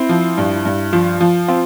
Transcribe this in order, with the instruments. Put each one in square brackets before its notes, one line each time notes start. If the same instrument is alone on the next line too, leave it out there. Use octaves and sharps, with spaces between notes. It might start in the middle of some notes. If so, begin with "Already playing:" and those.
Already playing: [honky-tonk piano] C4 [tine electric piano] E4
[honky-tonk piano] F3
G2
G2
[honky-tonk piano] F3 [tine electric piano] F4
[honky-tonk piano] F3
[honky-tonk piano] C4 [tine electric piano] F4